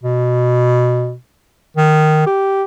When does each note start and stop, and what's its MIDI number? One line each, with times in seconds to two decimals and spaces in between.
0.03 1.15 47
1.77 2.25 51
2.27 2.64 67